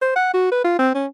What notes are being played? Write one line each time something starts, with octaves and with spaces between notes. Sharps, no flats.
C5
F#5
F#4
B4
F4
C4
C#4